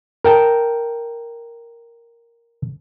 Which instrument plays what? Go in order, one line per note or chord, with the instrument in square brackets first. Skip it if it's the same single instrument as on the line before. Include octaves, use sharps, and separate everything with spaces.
[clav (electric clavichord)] A#4 G5 A5